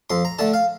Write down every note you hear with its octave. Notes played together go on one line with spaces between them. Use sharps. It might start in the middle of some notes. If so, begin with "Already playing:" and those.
F2 C6
A#5
D3 A3 A5
F5